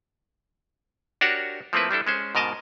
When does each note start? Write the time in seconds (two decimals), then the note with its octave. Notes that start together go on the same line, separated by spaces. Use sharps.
1.21 D4 F#4 G4 A#4 C#5 F#5
1.73 F3 A3 A#3 C4 E4 B4
1.91 G3 D4 E4 A4
2.07 G#3 C#4 C5
2.35 G#2 B2 A#4 D#5 A5